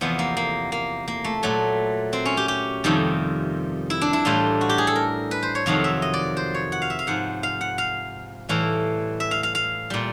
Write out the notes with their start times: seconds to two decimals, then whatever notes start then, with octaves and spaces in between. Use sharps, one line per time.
0.01 E2 C3 F3 B3
0.19 A#3
0.37 A#3
0.72 A#3
1.08 A#3
1.24 A3
1.43 A#2 F#3 A3
2.13 C4
2.25 C#4
2.37 G4
2.48 G4
2.84 F2 C3 D#3 G3
3.90 E4
4.01 D4
4.13 E4
4.25 A2 E3 G3 F4
4.61 F#4
4.69 G4
4.78 G#4
4.87 A4
4.96 A#4
5.31 B4
5.43 C5
5.55 C#5
5.66 F2 C3 D#3 F#3 F5
5.84 E5
6.02 D#5
6.14 D5
6.37 C5
6.54 C#5
6.72 F#5
6.82 F5
6.90 E5
6.99 F5
7.07 G#2 F3 F#5
7.43 F5
7.61 F#5
7.78 F5
8.49 A2 E3 G3 F5
9.20 E5
9.31 F5
9.43 F5
9.55 F5
9.90 A#2 G3